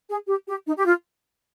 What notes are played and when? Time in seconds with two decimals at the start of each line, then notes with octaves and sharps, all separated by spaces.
0.08 G#4
0.27 G4
0.47 G4
0.66 D#4
0.77 G4
0.86 F4